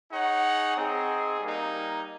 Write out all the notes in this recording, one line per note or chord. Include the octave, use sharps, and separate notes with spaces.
D#4 G#4 C#5 F#5
C4 D#4 G#4
G3 A#3 D#4